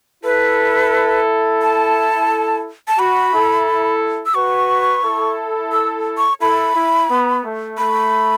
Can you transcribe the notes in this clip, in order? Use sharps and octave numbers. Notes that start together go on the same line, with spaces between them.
E4 A4 B4
A5
A5
F#4 B5
E4 A4
E6
F#4 B4 C#6
E4 A4
E6
C#6
E4 A4 B5
E4
B3
A3
A3 B5